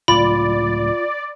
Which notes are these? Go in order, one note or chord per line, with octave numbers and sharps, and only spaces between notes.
C#2 A2 F#3 F4 D5 B5